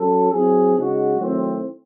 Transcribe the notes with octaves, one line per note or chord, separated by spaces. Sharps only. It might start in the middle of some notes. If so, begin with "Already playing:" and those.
Already playing: F#3 C#4 F#4 A4
F#3 C4 E4 G#4
C#3 G#3 D#4 F#4
D#3 F#3 A3 C4 E4